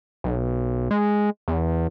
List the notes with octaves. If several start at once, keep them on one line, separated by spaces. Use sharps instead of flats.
B1
G#3
E2